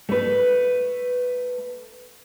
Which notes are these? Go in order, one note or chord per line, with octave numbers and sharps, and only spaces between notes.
A3 B4